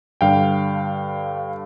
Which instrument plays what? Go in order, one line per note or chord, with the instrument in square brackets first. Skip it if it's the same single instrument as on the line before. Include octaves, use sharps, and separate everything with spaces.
[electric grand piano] G2 D3 G3 F5 G5